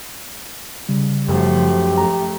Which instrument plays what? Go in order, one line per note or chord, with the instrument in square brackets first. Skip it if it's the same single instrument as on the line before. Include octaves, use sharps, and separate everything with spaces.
[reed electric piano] C#3 G3
[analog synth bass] F#2 [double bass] F3 A3 [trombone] G4
[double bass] A3 [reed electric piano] A#5